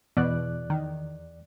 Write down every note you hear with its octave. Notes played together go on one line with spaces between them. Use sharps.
E2 B2 D5 F#6
D#3